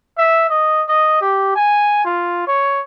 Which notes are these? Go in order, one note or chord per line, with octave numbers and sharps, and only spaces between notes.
E5
D#5
D#5
G4
G#5
F4
C#5